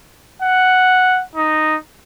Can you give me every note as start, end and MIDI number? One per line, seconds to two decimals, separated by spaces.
0.42 1.22 78
1.35 1.76 63